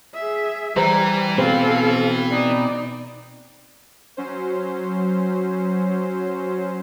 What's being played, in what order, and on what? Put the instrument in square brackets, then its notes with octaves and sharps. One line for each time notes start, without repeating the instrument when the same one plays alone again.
[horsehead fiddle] G#4 E5
[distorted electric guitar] E3 [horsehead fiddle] G3 [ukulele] C5 A#5
[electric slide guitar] B2 C4 [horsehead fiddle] A4 F5 [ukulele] C5
[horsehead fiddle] D#4 D5
[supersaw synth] F#3 C#4 C5